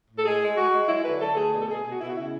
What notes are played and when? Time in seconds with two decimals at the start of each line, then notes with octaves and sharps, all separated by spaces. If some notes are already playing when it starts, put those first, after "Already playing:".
0.09 A2
0.18 A4
0.25 G#3 G#4
0.42 G#3
0.57 G#3 F#4
0.73 G#3
0.89 F#3 E4
1.05 D3 B4
1.21 D3 A4
1.36 A3 G#4
1.52 B2 G#4
1.60 A4
1.69 B2 G#4
1.84 B2 G#4
1.92 F#4
2.00 B2 E4
2.08 F#4
2.16 C#3 E4